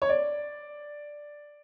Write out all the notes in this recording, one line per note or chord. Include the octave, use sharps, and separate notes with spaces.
C#5
D5